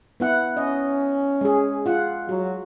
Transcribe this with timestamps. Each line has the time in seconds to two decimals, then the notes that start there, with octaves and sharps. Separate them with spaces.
0.20 B3 E4 F#5
0.57 C#4 D#5
1.41 G#3 G#4
1.86 F4 F#5
2.29 F#3 F#4